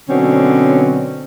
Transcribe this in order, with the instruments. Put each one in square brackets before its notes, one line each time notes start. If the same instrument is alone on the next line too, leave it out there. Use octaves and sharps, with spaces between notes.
[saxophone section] B2 D3 F#3 C4 C#4